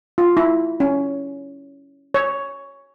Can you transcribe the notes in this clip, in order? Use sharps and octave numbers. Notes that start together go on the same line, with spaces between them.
F4
E4
C#4
C#5